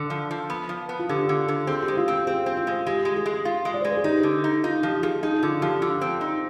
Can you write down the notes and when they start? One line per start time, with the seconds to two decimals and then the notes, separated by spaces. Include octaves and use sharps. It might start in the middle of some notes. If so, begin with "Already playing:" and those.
Already playing: D3
0.10 F3
0.31 F3
0.50 B3
0.69 F3
0.89 B3
0.99 F4
1.09 D3 G4
1.29 D3
1.48 D3
1.67 C4 G#4
1.83 G4
1.88 G#3
1.97 F4
2.08 C4 G4
2.27 C4 G#4
2.46 C4
2.57 F4
2.67 G#3
2.86 G#3 G4
3.05 G#3
3.16 G#4
3.26 G#3
3.45 F4
3.65 G#3
3.74 D5
3.81 C5
3.85 G#3
3.90 B4
3.97 G#4
4.04 D#4 G4
4.23 D3
4.44 D#4
4.63 D#4 F4
4.83 F3 G4
5.03 F3 G#4
5.23 D#4 G#4
5.43 D3 F4
5.61 F3 G4
5.82 D3 F4
6.01 C4
6.21 D#4